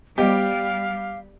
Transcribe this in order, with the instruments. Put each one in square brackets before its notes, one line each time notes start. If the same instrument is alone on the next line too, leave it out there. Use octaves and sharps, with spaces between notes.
[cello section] G3 [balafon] B3 C5 D#5 [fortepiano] G4 [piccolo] F5